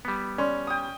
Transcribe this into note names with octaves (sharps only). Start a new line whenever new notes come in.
G3 B3
C#4 D5 C6
G5 D#6